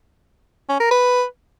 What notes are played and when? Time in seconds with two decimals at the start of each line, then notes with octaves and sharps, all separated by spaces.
0.69 C#4
0.80 A#4
0.91 B4